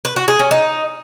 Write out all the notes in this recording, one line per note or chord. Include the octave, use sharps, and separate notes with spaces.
B4
F#4
G#4
C#4
D#4